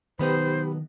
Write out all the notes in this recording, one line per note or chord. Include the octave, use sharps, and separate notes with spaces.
B1 D#3 B3 D#4 G4 B4 C5 B5